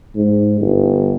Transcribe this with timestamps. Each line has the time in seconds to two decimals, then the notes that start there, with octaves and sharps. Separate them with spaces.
0.15 G#2
0.61 G1